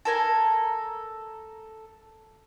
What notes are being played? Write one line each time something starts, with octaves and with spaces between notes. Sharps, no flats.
A4 A#4 G#5